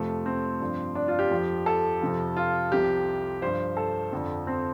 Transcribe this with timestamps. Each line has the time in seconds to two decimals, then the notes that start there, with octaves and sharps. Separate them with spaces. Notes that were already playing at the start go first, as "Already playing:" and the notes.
Already playing: F2 C3 F3 A3
0.26 C4
0.60 G2 F3
0.95 D4
1.08 F4
1.19 G4
1.31 F2 F3
1.66 A4
2.01 F2 C3 F3
2.37 F4
2.72 C2 C3 F3 G4
3.41 G2 F3 C5
3.77 A4
4.13 F2 D3 F3
4.47 C4